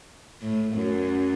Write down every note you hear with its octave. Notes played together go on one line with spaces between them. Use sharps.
A2
F#2